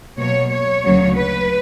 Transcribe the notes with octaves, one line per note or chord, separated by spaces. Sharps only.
B2 F#3 A#3 C#5
C#5
D2 C#3 F#3 A#3
B4